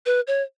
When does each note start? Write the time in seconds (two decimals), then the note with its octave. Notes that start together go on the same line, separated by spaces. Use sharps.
0.06 B4
0.27 C#5